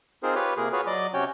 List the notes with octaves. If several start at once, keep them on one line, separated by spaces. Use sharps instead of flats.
C4 D#4 F4 G#4 A#4 C5
F4 G4 B4 C#5
C3 A#3 G#4 A#4
F4 F#4 G#4 B4 C#5
F#3 D5 D#5 D6
C3 C#4 F#4 C#5 G5